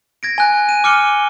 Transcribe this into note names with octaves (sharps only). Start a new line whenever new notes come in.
G#6 A#6 D7
G#5 F#6
D#7
D6 F6 C#7 D#7 G7